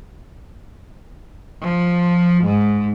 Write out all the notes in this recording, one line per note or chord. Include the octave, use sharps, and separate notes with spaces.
F3
G#2